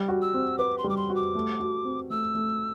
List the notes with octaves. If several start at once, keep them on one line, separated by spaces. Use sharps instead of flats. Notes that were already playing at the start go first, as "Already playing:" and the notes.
Already playing: G3
F#4
E6
C4
B4 D6
C6
G3 D6
C6
F#4
D6
A3
F#4
C4
A3 E6
A3